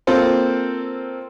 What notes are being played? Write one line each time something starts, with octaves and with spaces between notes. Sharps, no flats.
A#3 C4 F4 A4 C5